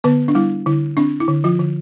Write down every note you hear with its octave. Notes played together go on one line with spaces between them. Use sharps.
D3 B3 B4
D4
G3 E4
D3 E4
C4 D4
E4
D3
F3 F4
D3